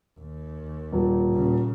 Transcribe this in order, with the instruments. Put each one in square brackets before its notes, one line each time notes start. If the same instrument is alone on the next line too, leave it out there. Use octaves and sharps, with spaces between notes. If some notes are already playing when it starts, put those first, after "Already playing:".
[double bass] D#2
[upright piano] D#1
[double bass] A#2 C#3